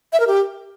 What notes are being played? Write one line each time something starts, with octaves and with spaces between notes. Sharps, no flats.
E5
A#4
G4